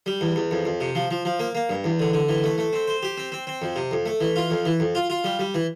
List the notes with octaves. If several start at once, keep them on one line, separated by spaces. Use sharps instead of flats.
G3
E2
E2
F2
F2
C3
F3
F3
F3
A#3
A#3
G2
E2
D3
D3
E3
A3
A3
C4
C5
G4
C4
C4
C4
F2
C3
F2
A3
E3
F4
F2
E3
F2
F4
F4
G3
G3
E3